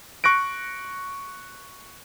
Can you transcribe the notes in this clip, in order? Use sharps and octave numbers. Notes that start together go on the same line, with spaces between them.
C#6 F#6 A#6 D7